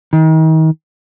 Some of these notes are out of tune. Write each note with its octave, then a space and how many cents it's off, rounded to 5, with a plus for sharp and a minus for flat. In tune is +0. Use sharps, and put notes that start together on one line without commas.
D#3 +35